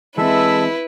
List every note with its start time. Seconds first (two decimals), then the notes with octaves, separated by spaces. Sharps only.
0.18 E3 G#3 C4 E4 A4 B4 E5